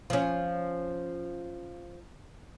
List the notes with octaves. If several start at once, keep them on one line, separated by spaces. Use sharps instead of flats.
F3 C#4